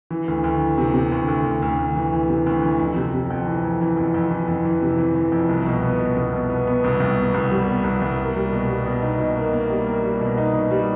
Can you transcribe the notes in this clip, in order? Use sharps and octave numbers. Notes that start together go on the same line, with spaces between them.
E3
D2
D2
E3
C3
C3
D2
D2
D2
D2
D2
E3
E3
C3
D2
E3
F2
C3
C3
F2
E3
F2
E3
F2
F2
E3
F2
E3
C3
E3
E3
F2
C2
B2
B3
B2
C2
B2
B3
B3
C2
C2
B3
C2
G3
B3
C2
C2
A#3
G3
B2
G3
B2
D#4
B2
A#3
A#3
G3
A#3
G3
B2
D#4
B2
G3